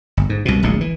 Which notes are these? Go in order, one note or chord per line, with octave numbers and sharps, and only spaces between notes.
G1
G#2
C2 B2
D1 A#1 A#2 G#3
E3